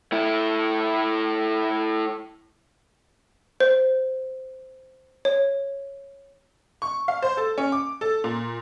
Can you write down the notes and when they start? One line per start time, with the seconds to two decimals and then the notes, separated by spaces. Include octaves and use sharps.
0.12 A3 E4
3.60 C5
5.25 C#5
6.82 C#6
7.08 F5
7.22 C5
7.37 A4
7.58 C#4
7.72 D6
8.01 A4
8.24 A#2